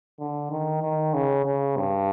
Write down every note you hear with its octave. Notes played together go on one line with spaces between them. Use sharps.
D3
D#3
D#3
C#3
C#3
G2